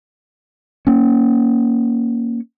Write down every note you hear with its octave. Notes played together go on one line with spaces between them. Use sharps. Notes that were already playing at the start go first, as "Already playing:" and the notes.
A#3 C#4